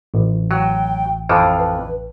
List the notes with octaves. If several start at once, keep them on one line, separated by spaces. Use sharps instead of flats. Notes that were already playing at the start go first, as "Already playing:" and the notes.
A1
F#3 G5
F2 E3 F3 F5
B4